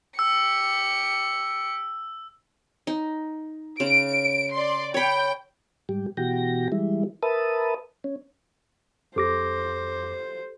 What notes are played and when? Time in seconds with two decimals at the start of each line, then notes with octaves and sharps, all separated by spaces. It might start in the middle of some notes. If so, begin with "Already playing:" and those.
0.19 G4 E6 C#7
2.87 D#4
3.80 C#3 D7
4.53 D5 C6
4.94 C#5 G5 B5
5.89 G#2 G3 G4
6.17 B2 E3 F#4 G4 G5 A#6
6.72 E3 G3 G#3 E4
7.23 A#4 B4 E5 A5 D#6
8.04 C#4
9.16 F2 G4 A4 C5 D6 A#6